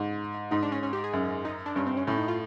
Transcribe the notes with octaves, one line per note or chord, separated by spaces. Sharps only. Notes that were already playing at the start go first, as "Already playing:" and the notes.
Already playing: G#2
G#2 D#4
D4
C#4
C#4
G4
G#4
F#2
D#4
D4
G2 C#4
C4
C#4
A2 C#4
D#4
F4